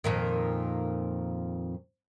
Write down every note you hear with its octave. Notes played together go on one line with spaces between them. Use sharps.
F2 A#2 D#3